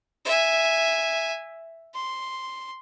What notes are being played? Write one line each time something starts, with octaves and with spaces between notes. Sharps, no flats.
E5 G#5
C6